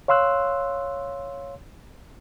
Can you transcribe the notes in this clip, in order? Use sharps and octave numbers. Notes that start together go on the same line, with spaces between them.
C#5 F5 C6 E6 F#6